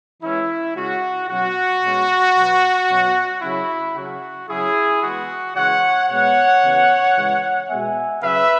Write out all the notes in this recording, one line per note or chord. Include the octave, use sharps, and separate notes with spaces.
E3 G#3 C#4 E4
C#3 G#3 C#4 F#4
B2 F#3 C#4 F#4
B2 G#3 C#4
B2 F#3 B3
B2 F#3 C#4
C#3 F#3 C#4 E4
C#3 F#3 C#4 F#4
C#3 F#3 C#4 E4 G#4
E3 G#3 B3 F#4
C#3 E3 G#3 C#5 F#5
B2 G#3 B3 C#5 F#5
C#3 E3 B3
C#3 E3 G#3
B2 G#3 B3 E5 G#5
C#3 F#3 C#4 B4 E5